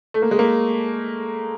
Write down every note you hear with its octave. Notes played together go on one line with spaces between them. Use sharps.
A3
A#3
G#3
A#3